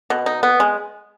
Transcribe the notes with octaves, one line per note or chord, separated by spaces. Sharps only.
B2
D#4
B3
G#3